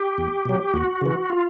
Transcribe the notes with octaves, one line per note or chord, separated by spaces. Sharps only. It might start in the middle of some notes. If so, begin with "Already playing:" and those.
Already playing: G4
E2
B2 F#3
D#2 F#4
C#3 E3
F4